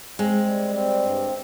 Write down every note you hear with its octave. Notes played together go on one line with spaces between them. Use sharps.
G#3 C4
G3
C4
G2